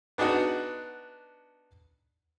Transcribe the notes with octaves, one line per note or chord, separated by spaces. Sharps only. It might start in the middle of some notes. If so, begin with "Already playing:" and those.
B3 D4 D#4 F#4 F#5